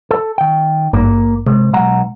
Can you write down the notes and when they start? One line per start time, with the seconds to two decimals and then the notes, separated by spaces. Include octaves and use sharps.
0.11 A4
0.38 D#3 G5
0.93 G#1 G2 A#3
1.47 C3 G#3
1.73 B1 F#5 A#5